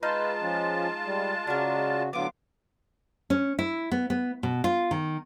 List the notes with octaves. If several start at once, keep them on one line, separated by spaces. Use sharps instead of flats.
G#3 D#4 F4 B4 A5 C6 F6
F3 C#4
G3
C#3 D4 F#4 A#4
A2 D3 F#3 B3 F4 D6
C#4
E4
B3
B3
B2
F4
D#3